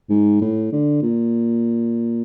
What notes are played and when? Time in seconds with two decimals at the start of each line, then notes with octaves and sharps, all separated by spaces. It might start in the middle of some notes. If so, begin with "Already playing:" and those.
0.10 G#2
0.41 A2
0.72 D3
1.03 A#2